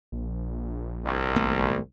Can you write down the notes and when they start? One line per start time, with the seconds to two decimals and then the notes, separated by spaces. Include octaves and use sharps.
0.12 A#1
1.05 C2
1.36 G#1 A3 B3